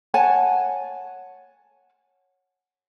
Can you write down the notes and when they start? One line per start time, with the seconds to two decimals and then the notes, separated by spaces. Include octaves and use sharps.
0.14 C#5 F#5 G#5 A5